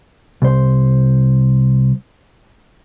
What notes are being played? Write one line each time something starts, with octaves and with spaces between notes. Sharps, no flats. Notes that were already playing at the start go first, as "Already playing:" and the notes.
C2 C5